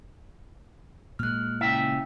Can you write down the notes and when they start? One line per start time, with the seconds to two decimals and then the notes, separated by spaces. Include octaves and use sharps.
1.19 A#2 G#3 F6 F#6
1.61 C#3 E4 E5 G5